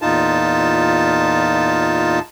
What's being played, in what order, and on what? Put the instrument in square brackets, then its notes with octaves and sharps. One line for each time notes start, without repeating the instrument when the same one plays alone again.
[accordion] E2 A#2 D#4 F4 A5